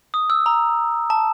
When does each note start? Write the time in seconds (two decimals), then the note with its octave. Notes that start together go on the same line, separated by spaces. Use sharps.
0.14 D#6
0.30 E6
0.46 A#5
1.10 A5